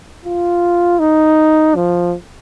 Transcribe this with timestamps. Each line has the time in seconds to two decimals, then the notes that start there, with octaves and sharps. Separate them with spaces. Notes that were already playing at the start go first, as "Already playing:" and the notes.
0.25 F4
0.99 D#4
1.75 F3